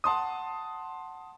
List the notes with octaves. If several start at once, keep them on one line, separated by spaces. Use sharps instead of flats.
F#5 A5 C6 D#6